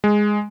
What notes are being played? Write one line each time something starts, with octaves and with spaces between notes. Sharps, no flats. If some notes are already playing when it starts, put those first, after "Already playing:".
G#3